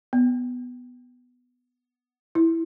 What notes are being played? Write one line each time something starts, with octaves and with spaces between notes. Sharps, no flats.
B3
E4